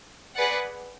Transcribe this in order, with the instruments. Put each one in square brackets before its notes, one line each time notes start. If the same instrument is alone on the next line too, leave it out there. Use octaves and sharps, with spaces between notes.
[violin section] G#4 B4 D5 F#5